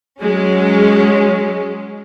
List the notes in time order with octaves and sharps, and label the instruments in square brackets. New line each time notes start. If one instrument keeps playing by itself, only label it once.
[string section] F#3 G#3 C#4